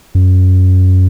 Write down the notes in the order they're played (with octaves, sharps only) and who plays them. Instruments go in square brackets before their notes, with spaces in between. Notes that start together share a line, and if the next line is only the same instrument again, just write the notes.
[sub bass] F#2